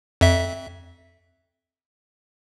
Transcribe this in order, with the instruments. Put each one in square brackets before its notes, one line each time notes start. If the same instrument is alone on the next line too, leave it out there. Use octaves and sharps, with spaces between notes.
[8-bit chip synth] F2 E5